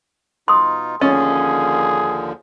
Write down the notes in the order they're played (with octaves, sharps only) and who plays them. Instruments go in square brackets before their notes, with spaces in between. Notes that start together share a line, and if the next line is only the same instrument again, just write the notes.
[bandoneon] B2 D#4 F4 [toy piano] C6 D#6
[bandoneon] D#2 D3 F3 [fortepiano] C#4 [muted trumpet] G#4 [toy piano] D#5